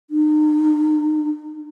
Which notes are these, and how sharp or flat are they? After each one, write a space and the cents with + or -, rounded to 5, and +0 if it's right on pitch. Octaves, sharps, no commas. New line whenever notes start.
D#4 -40